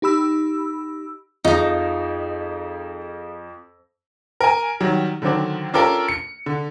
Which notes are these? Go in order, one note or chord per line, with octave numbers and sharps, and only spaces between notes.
D#4 G4 B5 E6
F2 F3 D#4 G#4 F5 A#5 D#6
A#4 G#5
D#3 F#3 G3
D3 D#3 F#3 C4 D4
C#4 D4 F4 G4 A4 A#4
C#7
D3